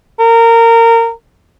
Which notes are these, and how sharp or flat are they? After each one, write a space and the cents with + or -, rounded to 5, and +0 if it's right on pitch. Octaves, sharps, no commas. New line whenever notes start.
A#4 -20